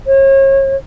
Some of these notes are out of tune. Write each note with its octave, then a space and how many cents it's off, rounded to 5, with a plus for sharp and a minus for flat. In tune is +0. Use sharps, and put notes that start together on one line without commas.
C#5 -35